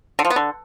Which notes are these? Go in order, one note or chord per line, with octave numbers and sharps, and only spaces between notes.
D3
F3
B3
D3